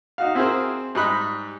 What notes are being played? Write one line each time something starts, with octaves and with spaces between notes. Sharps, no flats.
D#4 F#4 F5
C4 E4 F#4 G#4 A#4 C5
G#2 G3 D#4 B5 F#6